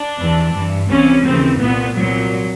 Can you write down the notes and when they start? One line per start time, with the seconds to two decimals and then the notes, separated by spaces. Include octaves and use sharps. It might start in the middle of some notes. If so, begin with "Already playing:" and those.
Already playing: D4
0.17 E2 C3 E3
0.52 G2 E3
0.88 C2 C3 E3 C#4
1.23 D#2 C#3 E3 C4
1.58 C2 A#2 B3
1.94 C2 A#2 F#3